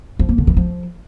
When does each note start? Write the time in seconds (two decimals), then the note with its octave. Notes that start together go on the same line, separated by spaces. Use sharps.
0.19 F3
0.29 A#3
0.38 D3
0.47 E3
0.57 F3